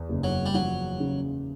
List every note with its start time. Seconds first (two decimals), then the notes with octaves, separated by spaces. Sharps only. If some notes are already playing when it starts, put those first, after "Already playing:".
Already playing: E2
0.09 F#1
0.24 F#3
0.46 G3
0.54 F3 F#3
1.00 C#3